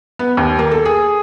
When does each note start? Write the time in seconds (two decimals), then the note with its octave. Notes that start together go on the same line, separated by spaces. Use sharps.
0.19 B3
0.37 D#2
0.59 A#3
0.71 A4
0.85 G#4